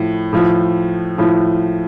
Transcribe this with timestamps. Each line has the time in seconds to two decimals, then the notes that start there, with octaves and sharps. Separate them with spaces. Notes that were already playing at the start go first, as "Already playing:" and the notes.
Already playing: A2 F3
0.33 A2 F3
1.18 A2 F3